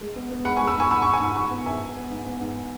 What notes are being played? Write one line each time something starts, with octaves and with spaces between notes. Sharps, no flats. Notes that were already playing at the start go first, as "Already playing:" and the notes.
G#3
B3
B3
G#3 F#5 B5
G#5 C#6
G#3
B5 E6
G#2 G#5 C#6
G#2 B5 E6
G#5 C#6
G#2
G#5 C#6
G#2 B5 E6
G#2 G#5 C#6
B3
G#2 E5 G#5
B3
B3
G#2
B3
G#2